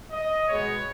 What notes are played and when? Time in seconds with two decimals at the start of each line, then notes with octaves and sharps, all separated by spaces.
0.11 D#5
0.48 B2 G#3 B3 C#5